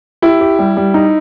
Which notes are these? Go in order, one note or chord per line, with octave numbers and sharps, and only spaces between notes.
E4 G4
G4
G3
G3
D#4